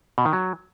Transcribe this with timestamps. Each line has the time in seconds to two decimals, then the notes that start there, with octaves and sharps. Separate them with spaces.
0.18 B2
0.25 D#3
0.33 F#3